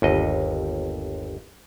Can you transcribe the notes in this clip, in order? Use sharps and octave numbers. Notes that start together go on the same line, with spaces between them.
G1 D#2 D#5